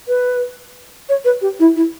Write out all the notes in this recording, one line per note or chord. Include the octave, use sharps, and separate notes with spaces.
B4
C#5
B4
G4
E4
E4